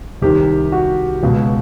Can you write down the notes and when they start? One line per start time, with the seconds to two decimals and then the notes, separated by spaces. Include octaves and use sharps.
0.22 C2 C3 D#3 G4
0.72 F#4
1.23 C#2 B2